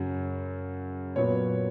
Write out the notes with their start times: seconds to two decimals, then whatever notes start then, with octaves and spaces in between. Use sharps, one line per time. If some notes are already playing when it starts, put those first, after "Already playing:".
Already playing: F#2 C#3 F#3
1.16 A#2 F#3 B3 C#5